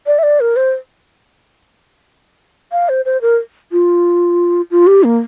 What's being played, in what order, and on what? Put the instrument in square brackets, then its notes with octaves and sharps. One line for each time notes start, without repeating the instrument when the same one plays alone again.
[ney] D5
E5
D5
A#4
C5
F5
C5
C5
A#4
F4
F4
G4
A#3